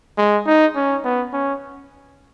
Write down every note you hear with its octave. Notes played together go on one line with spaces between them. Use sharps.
G#3
D#4
C#4
B3
C#4